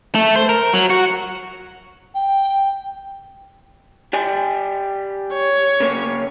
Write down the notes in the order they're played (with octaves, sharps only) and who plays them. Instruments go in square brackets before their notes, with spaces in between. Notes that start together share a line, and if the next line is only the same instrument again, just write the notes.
[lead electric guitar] A3
C5
A#4
F#3
F#4
[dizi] G5
[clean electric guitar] G4 D5 G#5
[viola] C#5
[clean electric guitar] C#3 A#3 C#4